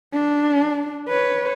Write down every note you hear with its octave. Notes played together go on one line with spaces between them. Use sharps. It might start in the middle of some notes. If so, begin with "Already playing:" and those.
D4
B4 C#5